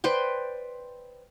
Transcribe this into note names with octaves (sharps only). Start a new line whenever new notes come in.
B4 C5 D5 G5